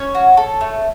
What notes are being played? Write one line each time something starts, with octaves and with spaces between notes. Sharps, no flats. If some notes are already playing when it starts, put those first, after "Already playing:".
Already playing: C#4 C#5
F#4
A4
A3